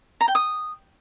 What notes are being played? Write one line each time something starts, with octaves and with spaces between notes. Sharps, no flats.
A#5
G5
D#6